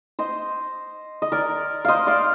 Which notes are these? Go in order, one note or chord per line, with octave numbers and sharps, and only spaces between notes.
C5 D#5
D#5
A#4 D5
C5 D#5 F5
D5 F5